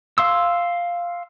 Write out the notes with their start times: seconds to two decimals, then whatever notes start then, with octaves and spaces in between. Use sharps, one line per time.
0.18 F5 C6 E6